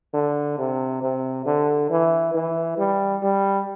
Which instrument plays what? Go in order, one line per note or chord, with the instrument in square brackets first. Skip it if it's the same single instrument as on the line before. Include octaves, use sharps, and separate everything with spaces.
[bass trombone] D3
C3
C3
D3
E3
E3
G3
G3